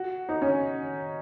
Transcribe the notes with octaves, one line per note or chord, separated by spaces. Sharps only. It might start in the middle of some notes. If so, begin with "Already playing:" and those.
Already playing: F#4
D#4
C#4